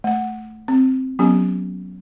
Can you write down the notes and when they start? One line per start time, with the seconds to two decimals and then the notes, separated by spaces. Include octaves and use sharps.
0.04 A3 F#5
0.68 C4
1.19 F#3 B3 C#4 G4